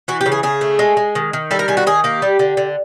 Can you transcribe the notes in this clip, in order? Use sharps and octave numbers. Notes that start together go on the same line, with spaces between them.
E3 F#4
G4
C#3
G#4
C#3 G#4
A3
G#3
G#3
D#3
D#3
G3 A4
A#4
D#3 G#4
F#4
D#3 G#4
A#3 G4
G3
D3
D3